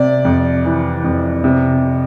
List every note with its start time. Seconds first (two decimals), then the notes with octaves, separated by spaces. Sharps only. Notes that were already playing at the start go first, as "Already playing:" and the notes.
Already playing: C3 D5
0.25 F2
0.65 E3
1.04 F2
1.44 C3